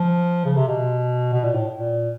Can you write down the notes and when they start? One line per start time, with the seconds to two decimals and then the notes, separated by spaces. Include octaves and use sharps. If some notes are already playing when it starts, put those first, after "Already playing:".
Already playing: F3
0.45 C#3
0.57 C3
0.67 B2
1.33 B2
1.44 A#2
1.55 A2
1.77 A#2